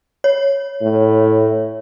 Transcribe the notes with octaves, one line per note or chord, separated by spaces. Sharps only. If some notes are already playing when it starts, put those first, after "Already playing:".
C#5
A2